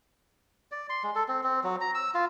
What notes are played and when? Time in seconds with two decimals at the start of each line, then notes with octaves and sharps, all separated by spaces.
0.72 D5
0.90 C6
1.04 G#3
1.15 A4
1.28 C4
1.44 C4
1.64 F#3
1.81 A#5
1.95 E6
2.14 F4